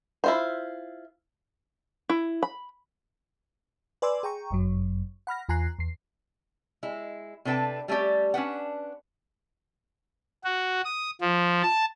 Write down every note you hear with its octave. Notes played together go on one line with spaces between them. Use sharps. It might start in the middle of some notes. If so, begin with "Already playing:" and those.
E4 F4 C5
E4
B5
B4 D5 G#5 C6 D6 E6
G#4 G5 A#5 C#6
G1 F#2 F#3
F#5 B5 F6 A#6
E2 F4 G#5 A#5 F#6 C7
E2 C7
G#3 E4
C3 D4 A4 B4 G5 A5
G3 A3 C#4 G4 D5
C#4 D4 B4 F#5
F#4
D#6
F3
A5